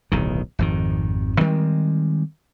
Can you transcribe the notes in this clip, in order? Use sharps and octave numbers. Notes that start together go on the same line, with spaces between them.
D1 B1 D#3
G#1 F2 D#3
D#3 G3 G#3 C4